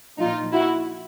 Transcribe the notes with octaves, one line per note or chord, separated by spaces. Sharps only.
A#2 F3 D#4 F4
E4 F#4